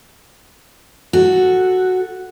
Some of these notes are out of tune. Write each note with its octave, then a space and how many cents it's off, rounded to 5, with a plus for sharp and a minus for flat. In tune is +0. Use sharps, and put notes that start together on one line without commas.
F#4 +0 A4 +0